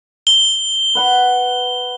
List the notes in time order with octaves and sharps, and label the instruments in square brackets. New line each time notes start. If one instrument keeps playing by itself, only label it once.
[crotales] G7
[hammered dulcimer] B4 F#5 B5